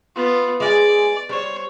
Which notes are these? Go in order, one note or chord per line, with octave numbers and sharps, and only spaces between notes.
B3 F4
G#3 D5 F5 G#5
G3 C5 C#5